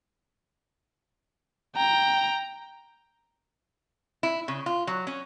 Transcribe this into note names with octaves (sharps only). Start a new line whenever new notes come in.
G5 A#5
E4
C#3
F4
F#3
C#4